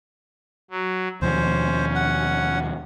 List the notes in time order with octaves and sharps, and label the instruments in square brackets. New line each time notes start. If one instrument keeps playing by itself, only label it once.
[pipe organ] F#3
[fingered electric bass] D#2 B2 F3 [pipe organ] C#4 [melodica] C5
[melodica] F#5